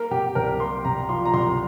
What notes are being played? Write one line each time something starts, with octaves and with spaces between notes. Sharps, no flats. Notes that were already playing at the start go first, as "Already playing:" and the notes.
Already playing: A#3 A#4
C3 G4
C2 A#4
A#3 C6
C3 A#5
F3 C6
A#5
C2 C6